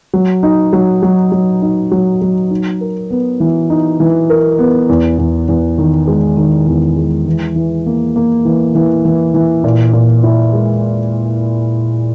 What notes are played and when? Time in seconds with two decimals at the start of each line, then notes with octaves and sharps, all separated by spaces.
0.14 F#3
0.43 D#4
0.73 F#3
1.03 F#3
1.32 F#3
1.62 D#4
1.92 F#3
2.22 F#3
2.51 D#4
2.81 A#4
3.10 B3
3.40 E3
3.70 D#4
4.00 E3
4.30 A#4
4.59 B3
4.89 E2
5.18 E2
5.48 E2
5.78 D#3
6.07 G#3
6.37 D#3
6.67 E2
6.96 G#3
7.26 E3
7.56 E3
7.86 A#3
8.16 A#3
8.45 E3
8.75 E3
9.05 E3
9.34 E3
9.64 A#2
9.93 A#2
10.23 E4
10.53 G#3